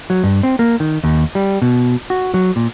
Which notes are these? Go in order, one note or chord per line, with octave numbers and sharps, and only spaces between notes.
F#3
G2
C4
A#3
D#3
D#2
G3
B2
F#4
F#3
A#2